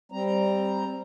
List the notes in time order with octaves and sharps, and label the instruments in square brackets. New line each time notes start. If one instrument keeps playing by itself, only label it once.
[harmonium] G3 C4 A#5